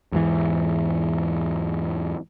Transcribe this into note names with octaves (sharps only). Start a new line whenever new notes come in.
E2 G#2 E3